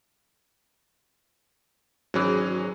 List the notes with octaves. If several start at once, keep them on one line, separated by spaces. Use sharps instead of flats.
G#1 E3 F#3 C#4 G#4